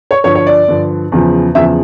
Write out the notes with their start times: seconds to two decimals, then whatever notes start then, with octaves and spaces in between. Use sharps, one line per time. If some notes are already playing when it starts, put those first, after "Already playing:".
0.11 C#5
0.24 G2 D3 F3 C#5
0.35 C#5
0.47 D5
0.68 G2 D3 F3
1.12 E2 C#3 F3
1.55 E2 C#3 F3 E5